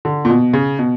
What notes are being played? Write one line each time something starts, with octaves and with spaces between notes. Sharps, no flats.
D3
A#2
B2
C#3
B2